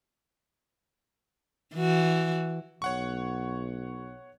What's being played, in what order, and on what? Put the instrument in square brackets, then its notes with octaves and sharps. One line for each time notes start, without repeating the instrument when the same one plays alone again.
[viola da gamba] E3 F#4
[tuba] B1 [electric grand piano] C#5 F#5 C#6